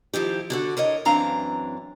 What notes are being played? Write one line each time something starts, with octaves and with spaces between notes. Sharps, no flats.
D#3 F3 E4 G4
D3 F#4 A4
A2 A#4 C#5 D#5
F#2 E3 C4 D4 F5 A#5